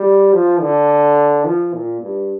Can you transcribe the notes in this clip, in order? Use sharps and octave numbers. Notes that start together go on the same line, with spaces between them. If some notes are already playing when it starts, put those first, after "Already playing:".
Already playing: G3
F3
D3
F3
A#2
G2